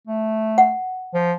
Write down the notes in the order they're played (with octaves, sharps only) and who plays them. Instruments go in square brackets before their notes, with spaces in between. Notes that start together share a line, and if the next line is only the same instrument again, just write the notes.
[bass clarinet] A3
[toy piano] F#5
[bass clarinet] F3